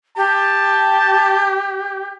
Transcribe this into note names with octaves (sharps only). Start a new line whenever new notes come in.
G4 A5